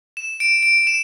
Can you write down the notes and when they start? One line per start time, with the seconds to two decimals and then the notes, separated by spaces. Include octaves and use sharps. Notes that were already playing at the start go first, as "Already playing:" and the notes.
0.17 E7
0.40 D7
0.63 D7
0.87 E7